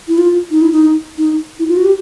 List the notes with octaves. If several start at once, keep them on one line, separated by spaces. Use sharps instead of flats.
E4
F4
D#4
E4
D#4
D#4
E4
F4
F#4
G4